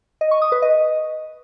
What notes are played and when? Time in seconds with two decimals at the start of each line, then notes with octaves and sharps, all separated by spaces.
0.21 D#5
0.31 C#6
0.42 D#6
0.52 B4
0.62 D#5